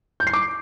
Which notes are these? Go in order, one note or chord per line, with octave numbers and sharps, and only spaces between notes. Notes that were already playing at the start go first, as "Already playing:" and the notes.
G6
C7
D6